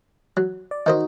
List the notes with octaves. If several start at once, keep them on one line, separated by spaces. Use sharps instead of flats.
F#3
D5
D#3 D#4 F#4 C5 D#5